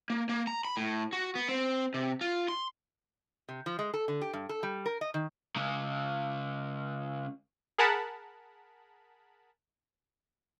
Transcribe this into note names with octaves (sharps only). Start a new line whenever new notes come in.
A#3
A#3
A#5
B5
A2
F#4
B3
C4
C3
F4
C6
C3
F3
G#3
A4
D3
G4
G2
A4
G3
A#4
D#5
D#3
C#3 G#3
G#4 A#4 F#5 A5 B5